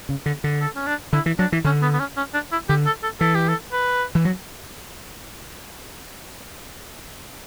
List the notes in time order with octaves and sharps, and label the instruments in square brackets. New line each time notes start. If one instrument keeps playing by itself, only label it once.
[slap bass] C#3
D3
D3
[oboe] A4
C#4
D4
[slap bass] D3 [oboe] E4
[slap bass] E3
[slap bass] F#3 [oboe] D4
[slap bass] E3
[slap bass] D3 [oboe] C#4
[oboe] B3
B3
C#4
C#4
D4
E4
[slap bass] D3 [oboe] G4
[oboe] A4
A4
[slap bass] E3 [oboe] A4
[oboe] G4
A4
B4
[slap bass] E3
F#3